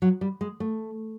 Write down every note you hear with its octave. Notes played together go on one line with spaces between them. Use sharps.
F#3
G3
G#3
A3